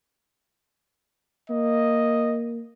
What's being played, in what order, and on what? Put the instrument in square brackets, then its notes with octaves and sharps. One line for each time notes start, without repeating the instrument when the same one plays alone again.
[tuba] A#3 [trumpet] D#5